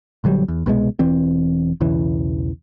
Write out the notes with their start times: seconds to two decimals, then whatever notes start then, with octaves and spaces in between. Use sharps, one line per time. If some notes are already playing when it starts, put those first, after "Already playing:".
0.24 A#1 D3 F#3 G3
0.48 E2
0.66 C2 B2 F#3 G#3
0.99 E1 E3 C4
1.81 B1 E2 C#3 E3